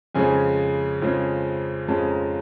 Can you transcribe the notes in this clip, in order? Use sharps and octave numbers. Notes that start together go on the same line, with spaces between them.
F2 C#3 F3 G#3 C#4 G#5
F2 C#3 F3 G#3 C#4
F2 C#3 F3 G#3 C#4 A5
A#5